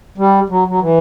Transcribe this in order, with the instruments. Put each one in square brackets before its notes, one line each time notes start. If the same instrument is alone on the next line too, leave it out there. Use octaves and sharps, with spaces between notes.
[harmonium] G3
F#3
F#3
E3